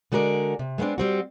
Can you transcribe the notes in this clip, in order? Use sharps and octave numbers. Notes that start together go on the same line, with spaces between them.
D3 G#3 F#4 A#4 D5
C3
G#3 A3 B3 C4 D4
G3 C4 F#4